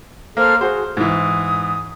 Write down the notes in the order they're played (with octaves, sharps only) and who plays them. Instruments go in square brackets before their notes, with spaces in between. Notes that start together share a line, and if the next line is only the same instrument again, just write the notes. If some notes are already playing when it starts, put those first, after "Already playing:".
[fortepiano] A#3 [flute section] A4 C5 F6
[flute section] F#4 G#4 [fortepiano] C5
[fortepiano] G#2 E3 [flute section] D#6